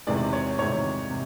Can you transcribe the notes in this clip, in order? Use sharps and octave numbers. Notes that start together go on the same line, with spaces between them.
E2 C3 D#3 G#3 D5
C#5
E2 C3 D#3 G#3 C#5
C3